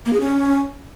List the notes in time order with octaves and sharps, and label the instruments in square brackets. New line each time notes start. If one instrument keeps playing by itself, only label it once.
[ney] A#3
G#4
C#4